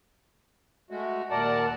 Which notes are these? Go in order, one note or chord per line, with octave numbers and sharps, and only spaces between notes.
G#3 A3 F#4
D#2 A#2 A#4 D5 F#5 A5